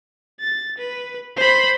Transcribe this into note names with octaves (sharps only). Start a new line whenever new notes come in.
A6
B4
C5 B5